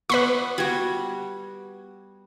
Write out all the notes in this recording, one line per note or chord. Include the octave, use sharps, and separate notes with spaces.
B3 B4 B5 C#6
G3 F#4 G#6